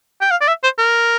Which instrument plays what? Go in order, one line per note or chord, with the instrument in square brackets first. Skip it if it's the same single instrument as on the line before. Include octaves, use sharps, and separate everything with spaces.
[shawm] G5
F5
D5
E5
C5
A#4